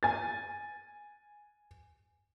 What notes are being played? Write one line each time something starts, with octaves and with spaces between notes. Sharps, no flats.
G#5 A6